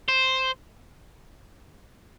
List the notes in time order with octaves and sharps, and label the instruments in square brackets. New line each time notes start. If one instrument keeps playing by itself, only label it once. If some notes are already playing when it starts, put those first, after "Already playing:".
[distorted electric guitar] C5